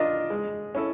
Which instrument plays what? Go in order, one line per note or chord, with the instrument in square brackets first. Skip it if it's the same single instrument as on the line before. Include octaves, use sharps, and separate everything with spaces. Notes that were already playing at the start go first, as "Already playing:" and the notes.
Already playing: [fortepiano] D4 F4 A#4 [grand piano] D#5
[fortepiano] G#3
C#4 E4 A4